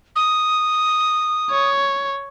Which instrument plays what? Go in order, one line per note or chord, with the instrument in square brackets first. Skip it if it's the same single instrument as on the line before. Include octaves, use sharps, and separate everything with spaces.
[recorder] D#6
[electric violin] C#5